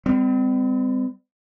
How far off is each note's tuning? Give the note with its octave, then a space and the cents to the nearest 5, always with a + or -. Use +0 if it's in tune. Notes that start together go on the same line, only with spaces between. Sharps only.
G3 +35 C4 -35